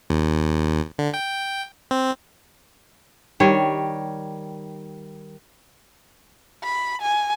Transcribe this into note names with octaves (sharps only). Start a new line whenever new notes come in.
D#2
D3
G5
C4
D#3 G3 C#5
B5
G#5